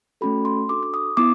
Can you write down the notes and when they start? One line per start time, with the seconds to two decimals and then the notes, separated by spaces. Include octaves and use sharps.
0.21 A3 C#4 F#4 A4 B5
0.45 C6
0.69 D4 F#4 A4 D6
0.83 D6
0.94 D#6
1.17 B3 E4 D6